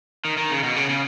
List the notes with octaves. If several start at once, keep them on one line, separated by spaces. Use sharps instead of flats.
D#3
D#3
C#3
B2
C#3
C#3